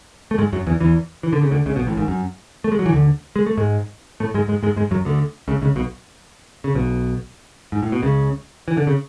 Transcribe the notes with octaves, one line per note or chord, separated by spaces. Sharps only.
A3
G#2 G#3
F#2 F#3
E2 E3
E2 E3
E3
D3
C#3
D2 D3
C#2 C#3
B1 B2
A1 A2
G#1 G#2
F#2
A3
G#3
F#3
E3
D2 D3
G#3
A3
G#2 G#3
A2 A3
G#2 G#3
G#2 G#3
G#2 G#3
G#2 G#3
F#2 F#3
D2 D3
C#2 C#3
C#2 C#3
B1 B2
C#3
B1 B2
G#2
A2
B2
C#2 C#3
E3
D3
C#3